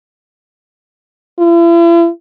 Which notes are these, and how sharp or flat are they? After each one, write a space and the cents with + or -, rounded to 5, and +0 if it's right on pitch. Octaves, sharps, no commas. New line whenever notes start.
E4 +45